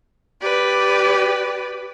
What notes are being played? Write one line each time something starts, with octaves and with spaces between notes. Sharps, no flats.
G4 B4 D5